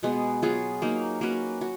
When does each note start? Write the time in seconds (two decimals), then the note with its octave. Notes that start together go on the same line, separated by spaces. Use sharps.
0.03 B2 G#3 B3
0.42 F#3 B3 F4 G#4
0.82 F#3 A#3 D#4
1.21 A#3 C#4 F#4 B4
1.61 F#4